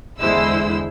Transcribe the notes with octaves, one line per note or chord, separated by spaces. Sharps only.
E2 D3 G#3 E4 C5 E6